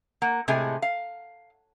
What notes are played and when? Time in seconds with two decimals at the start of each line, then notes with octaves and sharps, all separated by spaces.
0.22 A#3 F#5
0.48 A2 C3 G#3 A3 G#4 G#5
0.82 F5